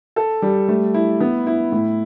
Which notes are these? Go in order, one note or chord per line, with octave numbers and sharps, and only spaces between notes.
A4
G3
A3
E4
B3
E4
A2